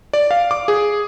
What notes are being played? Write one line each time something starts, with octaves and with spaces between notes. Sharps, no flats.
D5
F5
D6
G#4